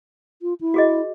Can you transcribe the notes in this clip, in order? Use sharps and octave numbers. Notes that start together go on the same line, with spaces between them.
F4
E4
F#4 G#4 D#5